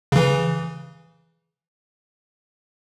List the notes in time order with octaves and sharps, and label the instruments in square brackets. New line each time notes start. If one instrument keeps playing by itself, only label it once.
[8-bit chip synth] C#3 E3